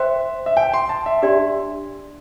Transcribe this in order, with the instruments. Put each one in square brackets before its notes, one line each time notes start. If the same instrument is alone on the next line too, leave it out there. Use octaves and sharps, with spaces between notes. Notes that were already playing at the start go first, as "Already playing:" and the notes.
Already playing: [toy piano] C5 G5 C6 [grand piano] E5
[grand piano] E5
G5
C6
A5
E5
[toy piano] D4 G4 D5 C6 [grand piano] E5